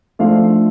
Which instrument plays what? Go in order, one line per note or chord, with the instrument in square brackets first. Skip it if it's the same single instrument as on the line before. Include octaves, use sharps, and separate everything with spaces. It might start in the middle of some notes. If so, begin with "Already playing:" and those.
[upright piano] D3 F3 A3 F5